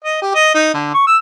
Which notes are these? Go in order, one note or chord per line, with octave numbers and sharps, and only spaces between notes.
D#5
G4
D#5
D#4
D3
C#6
E6